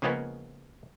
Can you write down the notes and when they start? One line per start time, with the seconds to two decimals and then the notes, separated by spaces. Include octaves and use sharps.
0.02 C#3 F3 G#3 A#3 B3 C#4